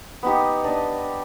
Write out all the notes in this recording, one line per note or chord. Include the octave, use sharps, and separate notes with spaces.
B3 D#4 G4
D4 D#5